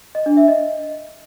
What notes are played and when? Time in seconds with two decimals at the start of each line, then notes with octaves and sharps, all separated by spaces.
0.15 D#5
0.26 D4
0.37 E5
0.48 D#5